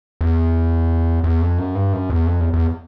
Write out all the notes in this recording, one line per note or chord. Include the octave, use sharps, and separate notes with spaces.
E2
E2
F2
F#2
G2
F#2
E2
F2
E2
E2